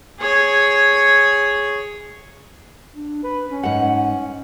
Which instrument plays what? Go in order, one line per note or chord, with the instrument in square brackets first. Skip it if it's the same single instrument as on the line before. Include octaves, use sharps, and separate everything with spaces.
[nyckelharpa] G#4 C#5
[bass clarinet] D4
B4
C#4
[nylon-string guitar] G#2 F#5